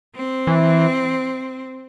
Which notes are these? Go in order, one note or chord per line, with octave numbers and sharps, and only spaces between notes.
C4
E3